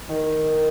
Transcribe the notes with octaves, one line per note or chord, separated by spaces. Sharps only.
D#3